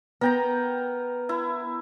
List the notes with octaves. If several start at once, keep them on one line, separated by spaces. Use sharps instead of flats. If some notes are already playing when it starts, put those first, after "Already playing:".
B3 A#4 G5 A#5
E4